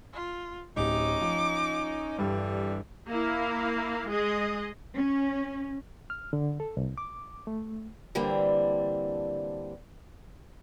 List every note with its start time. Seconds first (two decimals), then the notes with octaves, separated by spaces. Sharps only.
0.13 F4
0.77 D1 C#4 D#4 G4 D6
1.21 F3
2.18 G2 D3 E3 G3
3.08 A#3 E4 F5
4.10 G#3 G#4 D#5
4.95 C#4
6.10 F6
6.33 D3
6.60 A4
6.77 C2
6.98 D6
7.47 A3
8.15 D3 E3 G3 A#3 C4 D4